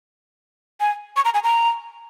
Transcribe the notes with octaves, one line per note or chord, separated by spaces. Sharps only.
G#5
C#6
A#5
G#5
A#5